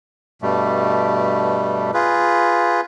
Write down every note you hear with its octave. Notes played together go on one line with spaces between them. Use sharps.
G2 B2 G3 A3
F4 G#4 B4